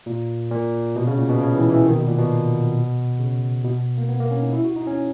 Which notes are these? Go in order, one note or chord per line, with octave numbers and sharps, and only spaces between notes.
A#2
A#2
B2
C#3
A#2
B2
C#3
E3
E3
D#3
B2
A#2
B2
C#3
B2
A#3
B3
A#3
C#4
D#4
E4
F#4
D#4
C#4